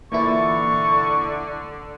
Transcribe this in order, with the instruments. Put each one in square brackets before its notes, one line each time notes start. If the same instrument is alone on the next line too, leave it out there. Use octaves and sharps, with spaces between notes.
[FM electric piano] A#2 E3 E4 [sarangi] D3 [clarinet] C#6